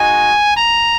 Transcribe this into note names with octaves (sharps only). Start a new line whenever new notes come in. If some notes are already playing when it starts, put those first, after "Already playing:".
Already playing: G#3 D#4 F#4 G#5
A#5